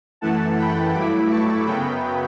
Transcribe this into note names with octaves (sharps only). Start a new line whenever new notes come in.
F#2 E3 A3 F#5 A5
G5 B5
G2 F#3 A3 E4 B5 D6
A5 C#6
F#2 C#3 F#3 B3 G5 B5